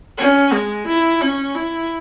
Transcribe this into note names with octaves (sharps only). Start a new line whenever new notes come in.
C#4
G#3
E4
C#4
E4